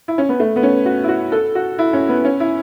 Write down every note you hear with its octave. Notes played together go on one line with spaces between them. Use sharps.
E4
C#4
B3
A3
B3
C#4
F#4
E4
F#4
A4
F#4
E4
C#4
B3
C#4
E4